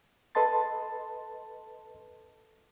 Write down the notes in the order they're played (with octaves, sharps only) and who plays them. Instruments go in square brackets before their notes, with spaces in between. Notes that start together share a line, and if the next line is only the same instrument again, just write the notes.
[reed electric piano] A4 B4 D#5 A5 C6 A6